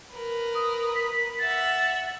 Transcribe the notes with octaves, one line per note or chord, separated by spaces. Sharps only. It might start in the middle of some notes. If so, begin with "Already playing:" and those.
A#4 B4
D#6
B6
E5 F#5 A6